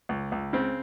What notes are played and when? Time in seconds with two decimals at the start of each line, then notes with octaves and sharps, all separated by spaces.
0.09 C#2
0.32 C#2
0.53 C#3 C4